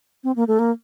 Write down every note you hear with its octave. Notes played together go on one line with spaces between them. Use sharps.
C4
A#3
A3
A#3